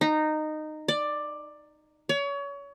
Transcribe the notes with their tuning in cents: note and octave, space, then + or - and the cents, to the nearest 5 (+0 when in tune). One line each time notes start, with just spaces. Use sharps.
D#4 -15
D5 +10
C#5 +30